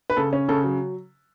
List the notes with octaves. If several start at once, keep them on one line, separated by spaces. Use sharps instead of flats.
B4
C#3 A4
C#4
C#3 A4
F#3